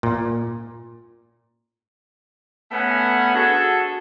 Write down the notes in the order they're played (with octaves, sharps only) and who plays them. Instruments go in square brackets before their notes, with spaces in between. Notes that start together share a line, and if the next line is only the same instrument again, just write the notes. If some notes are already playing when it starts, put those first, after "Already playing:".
[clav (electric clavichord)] A#2
[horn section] A3 B3 C#4 A4 F#5 G#5
D4 F#4 G#4 A4